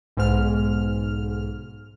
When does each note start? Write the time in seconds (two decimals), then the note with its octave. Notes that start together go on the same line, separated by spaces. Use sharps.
0.17 B1 G#2 F6